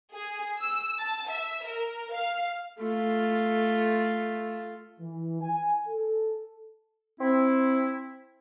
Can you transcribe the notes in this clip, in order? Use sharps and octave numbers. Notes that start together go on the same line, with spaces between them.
G#4
E6
A5
E5
A#4
F5
A3 F4
E3
G#5
A4
C4 E4